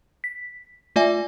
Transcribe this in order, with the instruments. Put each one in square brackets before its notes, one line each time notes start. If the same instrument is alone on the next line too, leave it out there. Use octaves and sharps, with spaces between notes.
[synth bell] B6
A3 F4 D5 E5 G#5